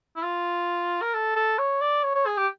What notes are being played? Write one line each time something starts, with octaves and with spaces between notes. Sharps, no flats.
E4
F4
A#4
A4
A4
C#5
D5
C#5
C#5
G#4
G4